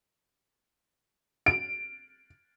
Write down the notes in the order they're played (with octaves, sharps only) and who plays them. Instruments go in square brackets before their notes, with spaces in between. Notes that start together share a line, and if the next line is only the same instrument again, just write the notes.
[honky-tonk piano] D7